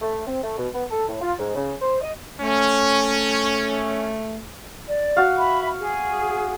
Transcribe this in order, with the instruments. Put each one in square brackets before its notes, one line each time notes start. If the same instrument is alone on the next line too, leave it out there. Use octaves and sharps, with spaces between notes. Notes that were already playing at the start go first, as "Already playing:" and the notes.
[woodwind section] A3
C4
A3
B2
B3
A4
A2
F4
G#2
C#3
C5
D#5
[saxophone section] A3 [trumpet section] C#4
[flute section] D5
[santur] F#4 F5
[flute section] E5 B5
G#4